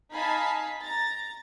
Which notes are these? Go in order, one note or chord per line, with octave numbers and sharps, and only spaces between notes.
D#4 F5 G#5 A5 B5 B6
A#5 A6